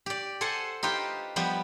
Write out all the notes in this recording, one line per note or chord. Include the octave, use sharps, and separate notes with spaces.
G4 D5
A4 C5 F#5 G#5 A5
D#4 F4 G4 B4 C5 G5
F3 G3 B3 G4